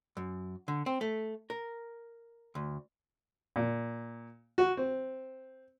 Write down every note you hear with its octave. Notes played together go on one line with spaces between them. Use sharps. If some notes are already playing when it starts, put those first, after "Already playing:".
F#2
D3
C4
A3
A#4
D2
A#2
F#4
C4